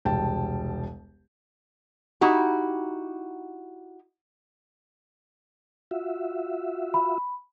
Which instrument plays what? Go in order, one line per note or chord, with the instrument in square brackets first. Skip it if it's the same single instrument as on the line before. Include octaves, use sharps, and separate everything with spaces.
[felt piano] E1 C2 G5 A5
[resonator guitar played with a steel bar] D#4 E4 F#4 G4
[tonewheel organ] F4 F#4 E5
[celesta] B5